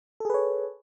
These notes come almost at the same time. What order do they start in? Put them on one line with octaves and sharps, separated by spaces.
A4 G#4 B4 C#5